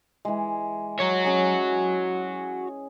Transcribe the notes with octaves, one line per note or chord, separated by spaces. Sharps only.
E3 G#3
F#4 C#5
C#4 G#4